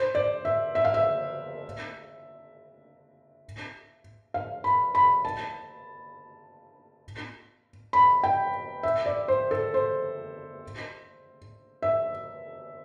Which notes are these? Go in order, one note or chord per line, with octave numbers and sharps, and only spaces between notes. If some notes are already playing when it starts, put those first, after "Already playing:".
Already playing: C5
D5
E5
E5
F5
E5
F5
B5
B5
A5
B5
G5
E5
D5
C5
A4
C5
E5